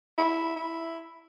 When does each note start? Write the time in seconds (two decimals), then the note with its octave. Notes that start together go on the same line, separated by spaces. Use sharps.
0.18 E4
0.56 E4